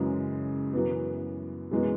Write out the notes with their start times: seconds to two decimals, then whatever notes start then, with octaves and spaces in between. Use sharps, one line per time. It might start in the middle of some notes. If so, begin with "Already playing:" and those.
Already playing: F#2 C#3 E3 G#3
0.73 F#2 E3 B3
1.71 F#2 E3 G#3 B3